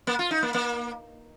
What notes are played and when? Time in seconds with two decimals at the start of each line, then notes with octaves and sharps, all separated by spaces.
0.07 A#3
0.19 F4
0.31 D#4
0.43 A#3
0.54 A#3